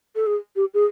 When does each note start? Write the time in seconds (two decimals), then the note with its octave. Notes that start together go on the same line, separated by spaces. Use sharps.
0.16 A4
0.27 G#4
0.56 G4
0.74 G#4